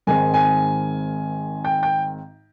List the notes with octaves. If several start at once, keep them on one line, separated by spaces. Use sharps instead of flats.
G#1 G#2 D#3 G#3 C4 G#5
G#5
G5
G5